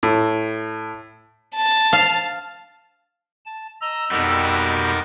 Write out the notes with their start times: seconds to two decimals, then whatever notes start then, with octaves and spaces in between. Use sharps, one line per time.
0.03 A2
1.55 A5
1.93 F5
3.46 A5
3.81 D#5 A#5 E6
4.11 F2 B2 G3 D#4 A#4 D#5 F#5 D6